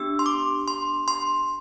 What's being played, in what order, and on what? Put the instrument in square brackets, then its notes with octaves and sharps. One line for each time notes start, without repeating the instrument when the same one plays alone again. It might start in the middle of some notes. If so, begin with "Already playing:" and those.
Already playing: [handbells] B3 D4 G4 E6
C6
D6
C6
C6